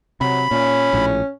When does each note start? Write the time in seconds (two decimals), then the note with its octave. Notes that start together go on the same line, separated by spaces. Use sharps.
0.21 C3 F#3 B5
0.51 A#2 C#4
0.93 A#1 A2